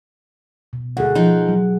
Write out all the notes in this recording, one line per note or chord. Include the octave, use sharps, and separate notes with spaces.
B2
D2 G#4 F#5
F3 D#4
F#3